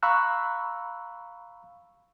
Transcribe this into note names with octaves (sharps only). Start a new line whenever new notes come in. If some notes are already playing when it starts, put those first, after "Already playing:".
F5 A#5 B5 C#6 E6 F#6